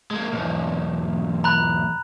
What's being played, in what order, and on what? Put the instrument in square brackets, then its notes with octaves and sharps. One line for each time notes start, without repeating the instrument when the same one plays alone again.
[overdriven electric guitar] G#3 A#3
B1 E2
[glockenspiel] A#5 B5 F#6